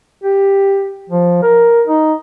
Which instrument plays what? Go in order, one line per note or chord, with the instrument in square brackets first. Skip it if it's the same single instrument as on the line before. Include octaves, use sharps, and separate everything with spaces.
[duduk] G4
F3
A#4
D#4